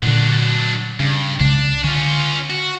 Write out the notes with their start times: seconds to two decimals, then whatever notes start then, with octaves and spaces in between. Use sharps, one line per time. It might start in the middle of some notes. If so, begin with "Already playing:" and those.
0.03 A#2 D3 F#3 D4
1.00 G2 C#3
1.40 C2 C#3 G#3 D4
1.84 D3 C#4 F4
2.50 F#4